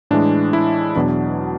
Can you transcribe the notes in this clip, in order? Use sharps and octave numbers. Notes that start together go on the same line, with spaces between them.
A2 E3 G#3 D4
E4
E2 B2 F#3 D4